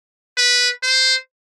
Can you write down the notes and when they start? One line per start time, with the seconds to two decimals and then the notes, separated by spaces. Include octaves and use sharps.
0.37 B4
0.83 C5